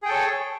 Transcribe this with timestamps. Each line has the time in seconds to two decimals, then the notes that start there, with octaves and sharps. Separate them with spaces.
0.02 G#4
0.05 G5
0.08 A4
0.11 C#5